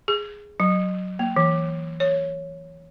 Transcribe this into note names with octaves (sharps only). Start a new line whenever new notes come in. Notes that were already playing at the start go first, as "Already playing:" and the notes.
G#4
F#3
A#3
E3
C#5